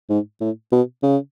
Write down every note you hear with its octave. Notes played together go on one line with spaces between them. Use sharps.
G#2
A2
B2
C#3